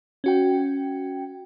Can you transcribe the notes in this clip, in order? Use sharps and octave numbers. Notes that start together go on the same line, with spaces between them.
C#4 F#4 G5